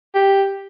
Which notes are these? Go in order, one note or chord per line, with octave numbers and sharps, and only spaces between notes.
G4